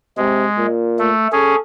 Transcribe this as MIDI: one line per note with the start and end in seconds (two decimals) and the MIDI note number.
0.17 0.45 48
0.17 0.66 56
0.57 1.11 46
0.99 1.28 57
1.32 1.56 61
1.32 1.56 68
1.32 1.59 69